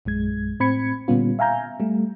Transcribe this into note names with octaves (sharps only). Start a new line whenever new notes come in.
A#1 F#2 G#3 G#6
A2 C4 B5 G#6 C#7
A#2 D3 G3 B3 C#4 F4
E5 F5 G#5 A#5 G6
G3 A3